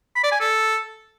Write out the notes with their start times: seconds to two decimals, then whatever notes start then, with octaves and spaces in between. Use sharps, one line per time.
0.15 B5
0.23 D5
0.32 G#5
0.40 A4